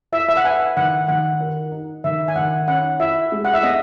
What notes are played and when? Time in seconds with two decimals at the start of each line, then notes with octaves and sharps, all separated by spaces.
0.12 E4 E5
0.29 E5
0.37 F#5
0.45 B4 G#5
0.77 D#3 F#5
1.08 D#3 F#5
1.41 A#4
1.72 D#4
2.04 D#3 E5
2.28 G#5
2.36 D#3 F#5
2.68 C#4 F#5
3.00 E4 E5
3.32 G#3
3.45 F#5
3.54 E5
3.63 B3 D#5